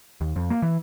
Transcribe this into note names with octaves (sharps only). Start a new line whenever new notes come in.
D#2
F2
A#3
E3